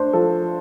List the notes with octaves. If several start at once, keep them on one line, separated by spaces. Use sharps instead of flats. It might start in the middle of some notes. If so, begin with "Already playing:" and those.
Already playing: A3 D4 C5
F3 A4